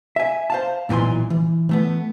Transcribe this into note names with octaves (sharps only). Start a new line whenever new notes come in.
E5 G#5
C5 F5 A5
B1 A#2 E3 G#5 C6
E3
E3 A3 B3